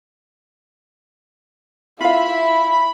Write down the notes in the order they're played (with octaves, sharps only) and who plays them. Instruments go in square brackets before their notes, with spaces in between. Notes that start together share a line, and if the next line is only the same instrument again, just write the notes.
[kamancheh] E4 E5 [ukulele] F4 F5 [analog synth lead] B5